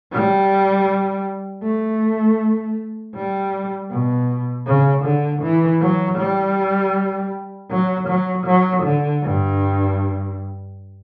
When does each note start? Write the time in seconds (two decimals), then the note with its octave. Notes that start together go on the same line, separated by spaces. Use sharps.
0.12 G3
1.63 A3
3.15 G3
3.91 B2
4.67 C#3
5.05 D3
5.42 E3
5.81 F#3
6.18 G3
7.71 F#3
8.08 F#3
8.46 F#3
8.84 D3
9.22 G2